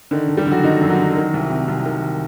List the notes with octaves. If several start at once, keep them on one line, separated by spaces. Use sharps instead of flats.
D3 D#3 D#4
D3
G3 G4
D3 F#3 F#4
D3 D#3 D#4
F#2
F#3 F#4
D3
D#3
C2
C3
C2
D#3